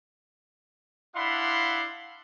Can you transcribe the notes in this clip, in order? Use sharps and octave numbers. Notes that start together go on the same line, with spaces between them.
D4 E4 F5 F#5 B5 C6